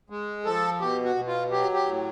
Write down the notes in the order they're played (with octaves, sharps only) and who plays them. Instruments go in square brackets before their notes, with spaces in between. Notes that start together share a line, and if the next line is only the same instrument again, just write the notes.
[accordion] G#3
F3 A4
B2 G4
F#4
B2
F4
F#3 G4
G4
A2